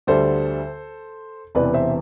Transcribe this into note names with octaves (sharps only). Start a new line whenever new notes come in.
D2 D3 G3 A4 C5
E1 E2 C3 E3 B4 D5
C5 E5